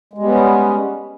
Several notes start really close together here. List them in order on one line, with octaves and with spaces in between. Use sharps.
G#3 G3 B3 C#4